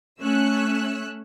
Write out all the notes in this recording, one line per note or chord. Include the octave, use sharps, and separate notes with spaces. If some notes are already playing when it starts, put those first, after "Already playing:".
A3 C#4 E6 F#6